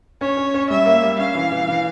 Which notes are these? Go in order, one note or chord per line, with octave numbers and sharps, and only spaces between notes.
C#4 C#5
C#4
C#4
G3 E5
A#3
G3
C#4 F5
E3
E3
E3